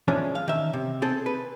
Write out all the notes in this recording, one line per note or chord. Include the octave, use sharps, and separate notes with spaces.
E3 F3 G#3 C#4 D4
F5
D#3 E5
C3
C4 G#4 A4
B4